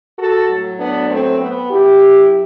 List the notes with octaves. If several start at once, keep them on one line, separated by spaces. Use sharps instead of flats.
F#4 A4
A2 F#3
B3 D4
A3 C4
B3
F#2 F#3 E4 G4